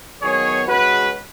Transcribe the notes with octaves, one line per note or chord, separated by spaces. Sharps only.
D#3 F#3 B3 G#4 C#5
C#3 G#3 C#4 F#4 B4